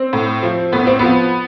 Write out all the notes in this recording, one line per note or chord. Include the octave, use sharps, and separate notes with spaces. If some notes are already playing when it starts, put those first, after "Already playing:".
Already playing: C4
A2
F3
A2 B3
C4
F3 B3